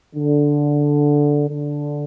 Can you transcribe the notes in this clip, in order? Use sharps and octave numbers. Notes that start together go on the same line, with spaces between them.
D3
D3